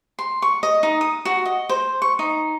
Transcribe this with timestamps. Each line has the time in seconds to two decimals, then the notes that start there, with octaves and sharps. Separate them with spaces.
0.19 C6
0.42 C#6
0.63 D#5
0.83 D#4
1.01 D#6
1.25 F#4
1.46 D#5
1.69 C5
2.02 C#6
2.19 D#4